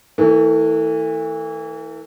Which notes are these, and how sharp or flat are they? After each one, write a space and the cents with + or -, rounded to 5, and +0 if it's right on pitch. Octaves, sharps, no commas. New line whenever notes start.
E3 -25 A3 +30